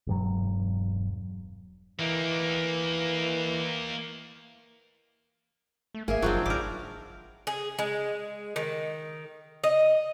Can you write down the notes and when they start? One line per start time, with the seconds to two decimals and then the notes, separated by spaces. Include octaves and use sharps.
0.07 E1 G2 F#3
1.99 E3 A#3 D#4
5.94 A3
6.08 G#1 A#3 G#4 E5
6.22 F#1 F3 F#3 C4 D4 D#4 G#4 G5
6.46 G#1 G3 A#4 D6
7.47 G#4
7.79 G#3
8.56 D#3
9.64 D#5